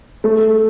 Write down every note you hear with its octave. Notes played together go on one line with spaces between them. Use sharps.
A3